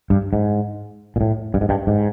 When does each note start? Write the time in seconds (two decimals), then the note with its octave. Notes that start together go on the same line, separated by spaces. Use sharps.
0.10 G2
0.33 G#2
1.16 A#2
1.21 A2
1.54 G2
1.61 G#2
1.69 G2
1.87 G#2